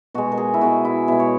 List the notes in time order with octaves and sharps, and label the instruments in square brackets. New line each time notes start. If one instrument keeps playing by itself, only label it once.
[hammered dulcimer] B2 G#3 F#4
A#4
G#4
E4
B2 G#3 F#4
E4
B2 G#3 E4
C#5